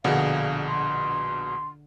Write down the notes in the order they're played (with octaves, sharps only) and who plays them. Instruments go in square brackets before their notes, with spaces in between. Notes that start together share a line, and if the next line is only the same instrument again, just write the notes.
[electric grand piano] A#1 B2 [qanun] D3 G#4 [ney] F5
[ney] C6